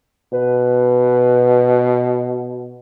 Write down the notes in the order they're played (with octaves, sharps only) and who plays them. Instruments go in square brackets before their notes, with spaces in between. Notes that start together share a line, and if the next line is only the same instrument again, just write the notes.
[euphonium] B2 [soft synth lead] B4